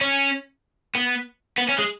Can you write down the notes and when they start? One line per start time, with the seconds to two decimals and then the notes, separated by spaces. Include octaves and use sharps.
0.01 C#4
0.95 B3
1.58 B3
1.68 C#4
1.78 G#3